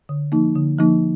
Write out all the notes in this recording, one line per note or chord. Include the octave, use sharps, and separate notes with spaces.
D3
F3 A#3 D#4
D3
F3 A#3 D#4